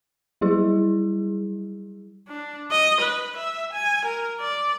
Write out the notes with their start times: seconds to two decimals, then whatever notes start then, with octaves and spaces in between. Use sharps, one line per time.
0.41 F#3 G3 E4 G#4
2.28 D4
2.72 D#5
3.01 B4
3.37 E5
3.73 G#5
4.05 A#4
4.41 D5